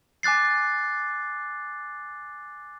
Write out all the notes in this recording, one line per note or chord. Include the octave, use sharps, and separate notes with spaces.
G#5 D6 F#6 A6 C7